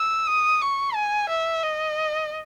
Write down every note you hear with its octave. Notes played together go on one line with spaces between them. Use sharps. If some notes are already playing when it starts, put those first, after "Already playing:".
Already playing: E6
D#6
C#6
G#5
E5
D#5